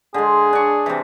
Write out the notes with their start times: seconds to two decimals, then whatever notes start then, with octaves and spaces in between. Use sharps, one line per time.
0.14 D3 G#3 G#4
0.53 D4 C#6
0.86 C3 E3